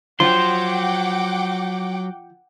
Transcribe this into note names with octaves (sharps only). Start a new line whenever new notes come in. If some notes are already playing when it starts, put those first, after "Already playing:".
F3 F#3 F#5 G5 C6 D6